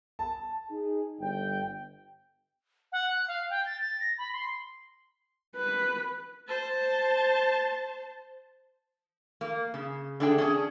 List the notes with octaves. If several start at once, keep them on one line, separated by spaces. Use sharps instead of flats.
A5
D#4 G#4
G1 G5
F#5
F#6
F5
G5
A6
A6
A#6
B5
C6
B4
C5 A5
A#3
C#3
D3 A3 D4 G#4 G5
C#4 D4 G#4